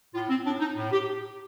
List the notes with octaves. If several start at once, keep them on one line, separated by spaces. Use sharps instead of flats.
A2 F4
C4
A2 D4
D#4
A2
G4